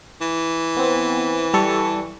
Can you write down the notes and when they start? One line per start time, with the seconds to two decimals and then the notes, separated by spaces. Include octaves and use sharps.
0.21 E3
0.77 B3 C4
1.54 G3 A4 C#6